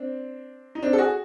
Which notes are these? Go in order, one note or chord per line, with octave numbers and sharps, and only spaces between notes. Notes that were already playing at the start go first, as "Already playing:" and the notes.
Already playing: C4 D4
D#4
C4 D4
A4
F#4 G#4